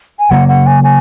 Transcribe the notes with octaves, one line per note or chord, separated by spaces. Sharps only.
G#5
C#3 F#3 A#3 F#5
F#5
G#5
G#5